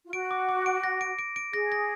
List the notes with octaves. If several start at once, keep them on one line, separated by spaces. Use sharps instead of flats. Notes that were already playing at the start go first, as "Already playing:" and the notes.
F4
F#4 D7
D6
D6
D7
A#6
D7
D7
D7
G#4 A#6
A#6